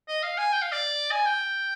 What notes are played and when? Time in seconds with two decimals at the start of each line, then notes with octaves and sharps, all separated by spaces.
0.08 D#5
0.23 F5
0.38 G#5
0.53 G5
0.62 F5
0.72 D5
1.11 G#5
1.26 G5